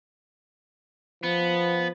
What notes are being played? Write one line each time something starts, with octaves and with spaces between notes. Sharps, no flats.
F3 B3